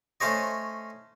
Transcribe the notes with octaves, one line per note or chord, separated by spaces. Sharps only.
A3 C#4 C5 C#5 D#5